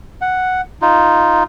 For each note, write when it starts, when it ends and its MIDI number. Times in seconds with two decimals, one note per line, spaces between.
0.21 0.61 78
0.82 1.43 63
0.82 1.43 65